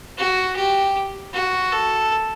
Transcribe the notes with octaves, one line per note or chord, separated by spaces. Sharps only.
F#4
G4
F#4
A4